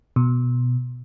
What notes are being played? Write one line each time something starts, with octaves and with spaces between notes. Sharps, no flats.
B2